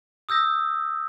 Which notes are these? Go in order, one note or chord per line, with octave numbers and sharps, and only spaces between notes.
D#6 E6 G6 A#6